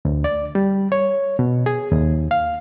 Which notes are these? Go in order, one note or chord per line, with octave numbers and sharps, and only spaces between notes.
D2
D5
G3
C#5
B2
G#4
D#2
F5